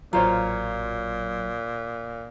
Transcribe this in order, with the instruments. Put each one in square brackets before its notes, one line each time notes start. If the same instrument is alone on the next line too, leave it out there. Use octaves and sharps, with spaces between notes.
[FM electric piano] A1 F#3 [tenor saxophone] A#2 [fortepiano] F4 C5 C#5 [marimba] A#5